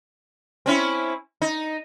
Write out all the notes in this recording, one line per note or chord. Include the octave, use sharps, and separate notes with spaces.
C4 C#4 E4
D#4